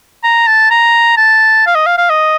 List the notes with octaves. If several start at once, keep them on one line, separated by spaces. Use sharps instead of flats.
A#5
A5
A#5
A5
F5
D#5
F5
F5
D#5